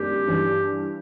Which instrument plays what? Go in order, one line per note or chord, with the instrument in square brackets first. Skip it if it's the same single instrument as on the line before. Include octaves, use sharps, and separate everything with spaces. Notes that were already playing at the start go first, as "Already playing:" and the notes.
Already playing: [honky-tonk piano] F#2 D#3 G#3 B3 D4 [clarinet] G4
[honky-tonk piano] G2 E3 G3